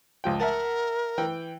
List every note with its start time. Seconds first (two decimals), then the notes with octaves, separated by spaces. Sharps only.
0.24 C#2 F3 G5
0.40 A#4 E5 F#5 A5
1.18 E3 G5